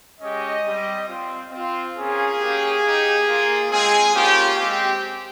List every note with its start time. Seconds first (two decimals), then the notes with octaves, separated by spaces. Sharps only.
0.20 G#3 C#4 G4 D#5
0.64 G3 C4 G4
1.07 C4 F4
1.52 C4 F4
1.95 A#3 C#4 F4 G#4
2.39 A#3 C#4 G4
2.83 A#3 D#4 G4
3.27 A#3 F4
3.70 G#3 C4 F4 G#4
4.14 A#3 C#4 F4 G4
4.58 G#3 C4 G4